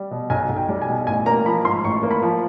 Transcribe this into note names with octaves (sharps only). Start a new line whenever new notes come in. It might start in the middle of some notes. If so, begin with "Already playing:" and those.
Already playing: G3
B2
B1 G#5
B1
G5
G3
G#5
B2
A1 G#5
A#3 A#5
F3 B5
G#2 C6
A1 C#6
A#3
B5
F3